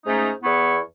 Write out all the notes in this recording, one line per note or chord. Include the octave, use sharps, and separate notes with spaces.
G#2 A3 C#4 D#4
E2 B3 E4 C#6